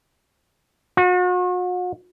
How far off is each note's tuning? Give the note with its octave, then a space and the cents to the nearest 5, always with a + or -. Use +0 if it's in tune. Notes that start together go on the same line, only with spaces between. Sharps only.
F#4 -40